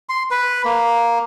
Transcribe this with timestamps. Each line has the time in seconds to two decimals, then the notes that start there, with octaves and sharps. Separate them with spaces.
0.09 C6
0.31 B4
0.65 A#3